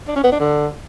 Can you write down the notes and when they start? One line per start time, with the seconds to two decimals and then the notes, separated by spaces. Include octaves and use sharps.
0.08 D4
0.16 C#4
0.24 B3
0.32 D4
0.40 D3